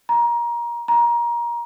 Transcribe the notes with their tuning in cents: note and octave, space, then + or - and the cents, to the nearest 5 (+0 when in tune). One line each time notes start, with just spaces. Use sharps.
A#5 +25
A#5 +25